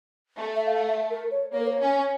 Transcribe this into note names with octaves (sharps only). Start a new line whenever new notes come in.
A3
E5
F5
E5
A#4
C#5
A#3 C#5
A#4
C#5
C#4